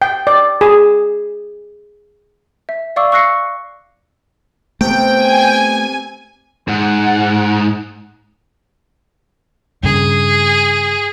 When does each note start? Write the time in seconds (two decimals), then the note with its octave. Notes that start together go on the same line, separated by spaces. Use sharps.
0.02 G5
0.27 D5
0.61 G#4
2.69 E5
2.96 D5 F5 C#6 D6 E6
3.12 C#6 E6 F#6 A#6 C7 C#7
4.81 C3 A3 B3 G5
5.20 G#5
6.68 G#2 F#5
9.83 G2 C#3 G#4